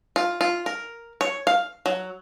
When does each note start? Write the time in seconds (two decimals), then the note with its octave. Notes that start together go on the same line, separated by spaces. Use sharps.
0.16 F4
0.41 F4
0.66 A#4
1.21 C#5
1.47 F5
1.86 F#3